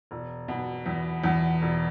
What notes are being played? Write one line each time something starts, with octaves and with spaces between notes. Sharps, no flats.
E1
B2
E2
E2
E1